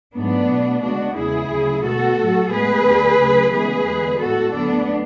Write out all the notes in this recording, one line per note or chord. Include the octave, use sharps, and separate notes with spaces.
G#2 F#3 A3 B3 D4
B2 A3
D2 C#3 G#3 B3 D4 F#4
E2 C#3 G#3 B3 E4 G#4
D2 C#3 F#3 A3
B2 G#3 B3 F#4 A4
A2 F#3 A3
A2 G#3 B3 G#4 B4
D2 D3 A3
D2 C#3 F#3 A3
D2 C#3 E3 G#3 B3 G#4 B4
E2 D3 G#3 B3
A2 G#3 B3 F#4 A4
D2 D3 F#3 B3 D4